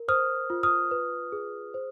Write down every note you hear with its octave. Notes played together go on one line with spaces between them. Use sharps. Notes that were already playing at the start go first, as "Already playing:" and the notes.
Already playing: A#4
C5 D#6 F6
F4
D#6 F6
B4
G#4
C5